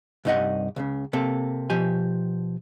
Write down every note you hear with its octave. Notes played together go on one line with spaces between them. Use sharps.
C2 G2 D#4 G4 D#5 F#5
C#2 A2 C#3
C3 A#3 A4
B2 F3 G4 G#5